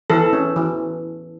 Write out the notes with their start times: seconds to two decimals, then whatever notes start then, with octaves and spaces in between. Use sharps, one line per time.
0.10 E3 A4
0.33 C#4
0.56 E3